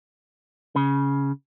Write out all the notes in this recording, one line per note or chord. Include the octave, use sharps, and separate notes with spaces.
C#3